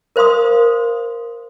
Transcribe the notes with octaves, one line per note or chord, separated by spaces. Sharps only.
A#4 C5 F5 C6 D#6